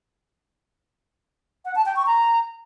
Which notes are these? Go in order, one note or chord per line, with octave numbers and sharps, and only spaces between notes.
F#5
A5
G5
C#6
A#5